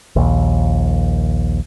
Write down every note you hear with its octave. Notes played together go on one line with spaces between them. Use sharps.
A#1 D#2